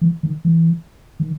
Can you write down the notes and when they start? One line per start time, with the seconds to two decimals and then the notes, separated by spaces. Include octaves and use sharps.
0.01 E3
0.23 D#3
0.45 E3
1.20 D#3